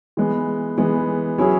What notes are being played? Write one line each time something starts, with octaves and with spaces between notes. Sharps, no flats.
E3 G#3 B3
E3 G#3 B3
F#3 C#4 E4 G#4